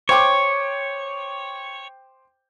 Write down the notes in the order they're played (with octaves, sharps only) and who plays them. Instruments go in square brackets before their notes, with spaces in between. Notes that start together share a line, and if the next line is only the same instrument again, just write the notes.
[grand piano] C5 G5 D6 [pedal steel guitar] C#5